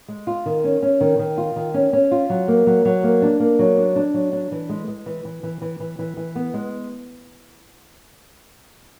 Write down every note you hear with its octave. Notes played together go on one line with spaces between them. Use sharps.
G#3
F4
D#3
C#4
C#4
D#3
D#3
F4
D#3
C#4
C#4
F4
F#3
A#3
F#3
F#3
A#3
D4
A#3
F#3
D4
D4
F#3
D4
E3
G#3
G#3
E3
E3
E3
E3
E3
E3
E3
B3
G#3